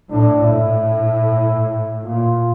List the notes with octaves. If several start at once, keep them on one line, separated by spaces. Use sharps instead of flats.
A2 D4
A2 E4
A#2 F4